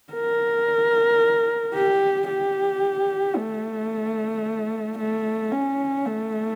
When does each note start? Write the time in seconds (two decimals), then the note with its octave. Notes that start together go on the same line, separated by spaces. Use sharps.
0.13 A#4
1.75 G4
2.28 G4
3.37 A3
4.98 A3
5.51 C#4
6.05 A3